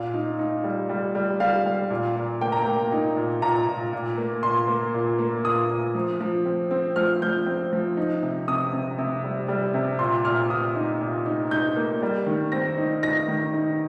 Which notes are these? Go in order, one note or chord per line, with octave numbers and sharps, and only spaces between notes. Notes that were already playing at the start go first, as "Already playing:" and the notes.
Already playing: A#2 F5
D#4
D#4
G3
G3
G3
G3 F5
G3
A#2
A#2
A#3 G5
A#5
A#3 G5
D#4
A#2
A#2 A#5
A#2
A#2
A#3
A#2 C6
A#3
A#2
A#3
A#2 D#6
A#2
F3
F3
C4
C4
F3 F6
F3 G6
C4
F3
D#4
C3
C3 D#6
C3
C3
G3
G3
C3
A#2 C6
A#2 F6
A#2 D#6
D#4
A#2
D#4
D#4 G6
A#3
G3
D#3
C4 A#6
D#4
D#4 A#6
D#3
D#4